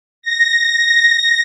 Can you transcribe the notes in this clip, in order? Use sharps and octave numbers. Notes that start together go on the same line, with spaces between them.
A#6